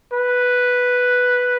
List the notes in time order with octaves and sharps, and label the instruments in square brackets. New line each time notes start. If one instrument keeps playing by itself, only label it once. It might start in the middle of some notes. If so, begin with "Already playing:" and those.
[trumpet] B4